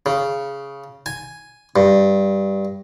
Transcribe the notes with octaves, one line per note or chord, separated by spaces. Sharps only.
C#3
G#5
G2